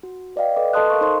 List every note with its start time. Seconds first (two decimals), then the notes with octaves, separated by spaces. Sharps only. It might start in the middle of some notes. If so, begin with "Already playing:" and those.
0.03 F#4
0.36 B4 D5 D#5 F5 G5
0.56 A4 B4 D#5 D6
0.73 A4 D#5 A5 C6 D#6 F#6
0.90 A#4 F5 C#6
1.01 D#4 A#4 C5 D#5 C6